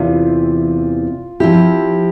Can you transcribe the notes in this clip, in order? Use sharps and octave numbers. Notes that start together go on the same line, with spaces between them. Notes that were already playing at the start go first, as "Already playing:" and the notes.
Already playing: E2 C3 E3 F4
F3 C4 E4 G4